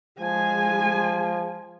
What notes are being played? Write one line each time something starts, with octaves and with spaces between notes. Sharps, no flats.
F3 G#3 G#5